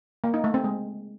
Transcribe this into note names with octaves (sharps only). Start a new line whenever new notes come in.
A#3
D#4
A3
C4
G#3